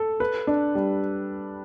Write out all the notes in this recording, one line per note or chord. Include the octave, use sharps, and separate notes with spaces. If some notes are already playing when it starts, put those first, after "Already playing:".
Already playing: A4
B4
D4
G3